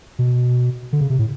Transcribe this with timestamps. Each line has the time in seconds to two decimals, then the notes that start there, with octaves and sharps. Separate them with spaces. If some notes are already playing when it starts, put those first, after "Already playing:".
0.19 B2
0.93 D3
1.01 C#3
1.10 C3
1.19 A2